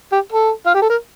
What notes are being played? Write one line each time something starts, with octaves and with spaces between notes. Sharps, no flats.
G4
A4
F4
G4
A4
A#4